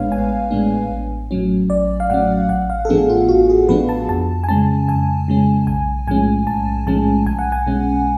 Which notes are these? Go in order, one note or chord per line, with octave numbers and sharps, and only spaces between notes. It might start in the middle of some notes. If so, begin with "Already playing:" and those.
Already playing: A1 A2 G#3 B3 D4 B4 C#5 F5
A1 G#5
A2 G#3 B3 D4
A1
A2 F#3 C#4
A1 D5
F5
A2 F#3 C#4 F#5
A1 F#5
F5
A4
A2 F3 B3 D4 G#4
F4
A1 F#4
G#4
A2 F3 B3 D4 B4
A5
F2 A5
G#5
C#3 G#3 C#4 A5
F2 G#5
C#3 G#3 C#4
B1 G#5
A2 F3 G#3 C#4 G#5
B1 A5
A2 F3 G#3 C#4 A5
B1 G#5
F#5
G#5
B2 G#3 C#4